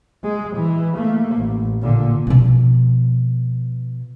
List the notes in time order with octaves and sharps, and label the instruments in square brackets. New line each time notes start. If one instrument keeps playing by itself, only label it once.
[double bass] G#3
E3
A3 A#3
A1
A#2 D3
[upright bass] B2 F3